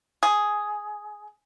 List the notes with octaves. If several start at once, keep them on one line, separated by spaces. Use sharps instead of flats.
G#4